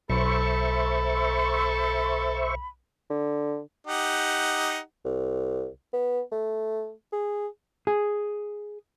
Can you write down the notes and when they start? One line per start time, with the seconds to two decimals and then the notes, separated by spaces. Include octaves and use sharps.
0.10 B1 A4 C5 E5 B5 C#6
3.10 D3
3.87 D#4 G4 F#5
5.05 C2
5.93 B3
6.32 A3
7.12 G#4
7.87 G#4